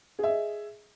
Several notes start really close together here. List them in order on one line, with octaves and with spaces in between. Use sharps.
G#4 E5 D#5